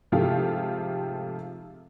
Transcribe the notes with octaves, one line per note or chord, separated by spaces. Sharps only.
G#2 C3 F3 A3 F4 G4